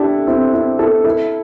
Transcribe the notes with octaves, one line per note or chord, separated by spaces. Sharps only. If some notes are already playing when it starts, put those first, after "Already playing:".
Already playing: D4 E4 G4 A4
C4 E4
C4 E4
E4 A4
E4 A4